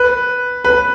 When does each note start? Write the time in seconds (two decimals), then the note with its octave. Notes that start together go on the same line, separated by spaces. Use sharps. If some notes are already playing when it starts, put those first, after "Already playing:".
Already playing: B4
0.64 B4